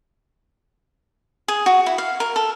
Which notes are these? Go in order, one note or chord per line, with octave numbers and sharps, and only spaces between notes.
G#4
F#4
E4
F5
A#4
A4